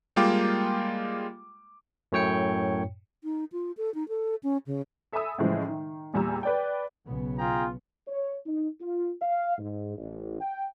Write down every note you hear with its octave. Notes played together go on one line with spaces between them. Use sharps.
G3 G#3 A#3 F4 G5 D6
F#2 A2 C#5 G5 C#7
D#4
F4
A4
D#4
A4
C#4
C#3
A4 E5 G#5 B5 D#6 E6
A2 C#3 E3 F3 G#3
D#3
E2 A#2 G3 G#5 A#5 E6
B4 D5 G5
B1 C#3 B3
F4 G#4 G5 A#5
C#5
D#4
F4
F5
G#2
A1
G5